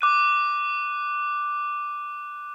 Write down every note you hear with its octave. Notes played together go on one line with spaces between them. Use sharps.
D6 F#6 D#7